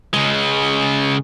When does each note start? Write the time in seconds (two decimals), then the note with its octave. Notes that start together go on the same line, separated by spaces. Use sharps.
0.14 C#3 G#3